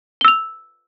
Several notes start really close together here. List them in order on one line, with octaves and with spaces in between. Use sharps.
G7 E6 F7